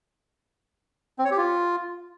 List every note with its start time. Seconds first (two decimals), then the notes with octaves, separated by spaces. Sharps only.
1.19 C4
1.25 C#5
1.31 G4
1.37 F4